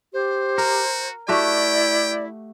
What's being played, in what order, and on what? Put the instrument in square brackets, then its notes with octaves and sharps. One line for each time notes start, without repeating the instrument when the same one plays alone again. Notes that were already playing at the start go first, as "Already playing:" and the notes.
[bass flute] G4 [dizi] C5
[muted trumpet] F#4 [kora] A#4
[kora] A3 F#4 G4 [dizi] E4 [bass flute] D5 [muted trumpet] G5